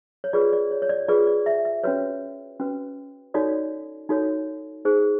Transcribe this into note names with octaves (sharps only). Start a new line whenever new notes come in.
C#5
F4 G#4 B4 D5
D5
C#5
C#5
D5
F4 G#4 B4 D5
D5
E5
E5
C#4 F#4 B4 C#5
C#4 F#4 B4
D#4 F#4 A4 C#5 D5
D#4 F#4 A4 C#5
D#4 G#4 C5